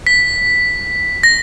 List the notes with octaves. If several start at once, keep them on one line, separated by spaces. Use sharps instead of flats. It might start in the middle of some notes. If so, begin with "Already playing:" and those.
B6
A#6